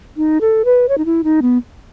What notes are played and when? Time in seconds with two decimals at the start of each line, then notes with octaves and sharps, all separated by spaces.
0.17 D#4
0.41 A4
0.65 B4
0.89 C#5
0.98 D#4
1.05 E4
1.24 D#4
1.42 B3